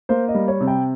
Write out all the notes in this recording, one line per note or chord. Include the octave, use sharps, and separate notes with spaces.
A#3 C5
D#5
G3
C#5
C3
G5